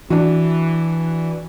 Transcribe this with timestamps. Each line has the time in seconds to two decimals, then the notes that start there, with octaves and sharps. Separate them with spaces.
0.10 E3 D4 F#4